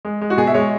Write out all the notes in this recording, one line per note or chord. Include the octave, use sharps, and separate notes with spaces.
G#3
G#3
F#4
B2 G#4
E5
G#3 C#5